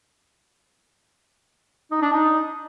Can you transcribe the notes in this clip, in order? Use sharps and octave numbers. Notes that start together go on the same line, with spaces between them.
D#4
D4
D#4